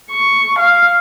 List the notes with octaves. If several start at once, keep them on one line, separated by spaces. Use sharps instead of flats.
C#6
F5